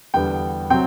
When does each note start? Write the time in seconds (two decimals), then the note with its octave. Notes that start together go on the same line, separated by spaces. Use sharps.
0.14 E2 D3 G3 B3 G5
0.70 C3 F#3 C4 G5